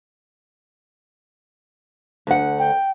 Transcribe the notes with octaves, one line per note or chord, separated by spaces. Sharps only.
D2 F#5
G5